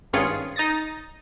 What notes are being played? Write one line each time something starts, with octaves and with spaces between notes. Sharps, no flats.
G#1 G2 C#4 F4 G#4 C#7
D#4 D#6 A6 A#6